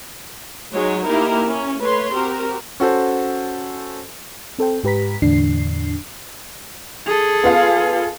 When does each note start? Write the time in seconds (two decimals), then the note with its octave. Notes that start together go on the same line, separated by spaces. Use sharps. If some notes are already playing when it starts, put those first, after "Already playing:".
0.74 F#3 G#3 D#4 C#5
1.08 A#3 D#4 E4 G4 A#4
1.46 C#4
1.81 A3 B4 C#5 C6
2.13 C4 F#4 G4 A#4
2.80 C#4 F#4 A4 C5
4.59 C4 A4 C5 G5
4.84 G#2 G4 B4 A#5 B6
5.22 E2 A2 D3 D4 C7
7.07 G#4 A4
7.43 B3 F4 F5